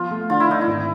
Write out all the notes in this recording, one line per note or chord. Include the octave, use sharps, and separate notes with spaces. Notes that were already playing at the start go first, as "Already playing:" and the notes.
Already playing: F3 B3 F4
A3
D3 F4
E4
D3 D#4
E4
G#1